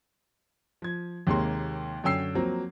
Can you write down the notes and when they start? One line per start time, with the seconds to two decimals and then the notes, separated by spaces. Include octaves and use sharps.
0.82 F3 G#6
1.27 D#2 C3 G#3 A#3 C#5 C6
2.04 F#2 D3 C#4 G5 E6 C7
2.35 F3 F#3 A#3 C4